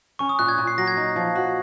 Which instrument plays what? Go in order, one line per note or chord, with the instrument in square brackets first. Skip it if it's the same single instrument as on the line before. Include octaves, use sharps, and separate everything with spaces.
[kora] C#4 [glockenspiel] C#6
[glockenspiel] D#6
[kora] A#2 [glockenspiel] F#6
[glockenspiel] G#6
[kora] A#2
[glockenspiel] C7
[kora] F#3 [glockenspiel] A#6
[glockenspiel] G#6
[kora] D#4
F3
F#4